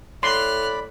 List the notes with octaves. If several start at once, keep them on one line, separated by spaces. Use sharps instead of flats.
A2 D5 B5 C6 F6 F#6